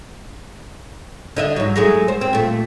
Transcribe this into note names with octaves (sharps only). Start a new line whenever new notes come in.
D3 D#5 E5
G#2 F#3
F#3 G#3 A3
C5
C4
A#2 A3